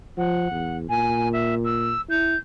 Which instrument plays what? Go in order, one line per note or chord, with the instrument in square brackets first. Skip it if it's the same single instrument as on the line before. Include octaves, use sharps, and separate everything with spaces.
[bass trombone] F3 [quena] F#5
[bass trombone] E2
[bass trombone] A#2 [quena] G#5
[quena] E5
E6
[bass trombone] E4 [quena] G6